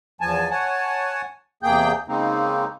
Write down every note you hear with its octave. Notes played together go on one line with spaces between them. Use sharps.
E2 F3 G#5 A5
C#5 F#5 G#5 A5
E2 C3 A#3 G#4 G5 G6
C#3 G#3 A#3 C4 D#4